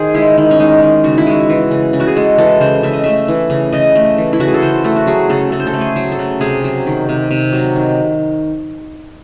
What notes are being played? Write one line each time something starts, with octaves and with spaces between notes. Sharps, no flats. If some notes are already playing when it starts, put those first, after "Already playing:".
Already playing: D#3 G#4 C5
G#3 E4
D#3
C#4
G#3 D#4
D#3
C#3 F#4
E4
G#3 F#4
E3
C#3
C#3
F#4
G#4
G#3 A4
E3 A4
C#3 C5
C#3 E5
D#5
A3 E5
E3
C#3
C#3 D#5
A3
E3
E4
C#3 F#4
G#4
A4
C#3 C5
A3 A4
F#4
F#3 G#4
C#3 A4
C#3 A4
C5
A4
A3
G#4
F#3
A4
C#3
C3 G#4
F#3
D#3
C3
C3
F#3
D#3